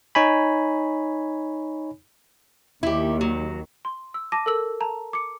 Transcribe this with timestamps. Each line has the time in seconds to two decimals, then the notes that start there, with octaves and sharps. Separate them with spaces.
0.15 D#4 C#5 G#5 B5
2.83 D#2 D#3 E4 G4
3.21 F#3
3.85 C6
4.14 E6
4.32 A5 D6 A#6 D#7
4.46 A4 A#4 E6 F#7
4.80 A5 A#5
5.13 D6 C#7